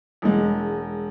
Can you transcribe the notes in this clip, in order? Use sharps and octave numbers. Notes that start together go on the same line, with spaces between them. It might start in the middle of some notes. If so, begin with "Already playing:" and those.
E1 G#3